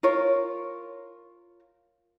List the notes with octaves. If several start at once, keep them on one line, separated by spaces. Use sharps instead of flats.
F4 A#4 C#5